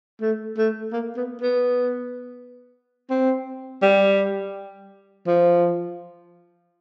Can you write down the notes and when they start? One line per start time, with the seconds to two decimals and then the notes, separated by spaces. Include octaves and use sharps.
0.21 A3
0.58 A3
0.93 A#3
1.17 B3
1.42 B3
3.10 C4
3.82 G3
5.27 F3